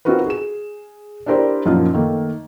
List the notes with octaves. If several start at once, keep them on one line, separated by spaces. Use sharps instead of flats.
C4 D#4 F4 F#4 A#4 B4
G#4 E7
D4 E4 G4 A#4 C5 D5
F#2 A#2 F3 A#3 D#4 F4
D#3 A3 A#3